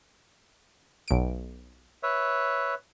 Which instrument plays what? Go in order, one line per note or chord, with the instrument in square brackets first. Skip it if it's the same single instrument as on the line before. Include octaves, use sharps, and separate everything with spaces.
[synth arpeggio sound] B1 D7
[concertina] B4 C#5 E5